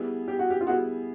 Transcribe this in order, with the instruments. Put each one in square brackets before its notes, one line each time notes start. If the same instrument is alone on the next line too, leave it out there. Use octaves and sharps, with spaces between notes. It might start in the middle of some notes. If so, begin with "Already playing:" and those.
Already playing: [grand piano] G3 B3 E4 G#4
[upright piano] G4
F#4
G4
F4
[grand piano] G3 B3 E4 G#4 [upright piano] F#4